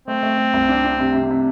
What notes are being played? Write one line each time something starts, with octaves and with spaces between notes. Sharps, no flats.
A3 C4
A3
A3
C2
D4
D4
C3
C3
C3